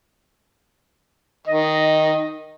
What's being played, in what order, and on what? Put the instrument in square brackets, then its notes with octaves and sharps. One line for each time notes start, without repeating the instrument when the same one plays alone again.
[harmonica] D#3 [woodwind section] D#5